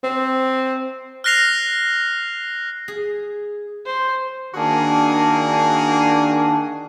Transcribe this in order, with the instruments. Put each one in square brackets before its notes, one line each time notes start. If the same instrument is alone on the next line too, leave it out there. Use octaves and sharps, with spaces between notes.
[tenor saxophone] C4
[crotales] F6 F#6 A#6 C7 F7
[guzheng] G#4
[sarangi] C5
[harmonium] D#3 D4 [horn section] A#3 F#4 G#4